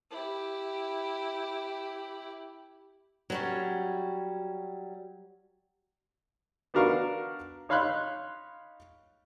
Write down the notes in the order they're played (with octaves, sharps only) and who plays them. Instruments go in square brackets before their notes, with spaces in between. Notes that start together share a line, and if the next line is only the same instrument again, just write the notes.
[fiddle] E4 G4
[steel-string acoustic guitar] F#3 G3 C#4
[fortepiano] B3 D4 F#4 A#4 F5 C#6
D#4 C#5 F5 B5 C6 F#6